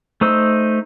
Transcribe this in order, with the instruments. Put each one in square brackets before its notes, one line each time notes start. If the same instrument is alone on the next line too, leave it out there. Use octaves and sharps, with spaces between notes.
[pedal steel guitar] A3 D#4 C5 E6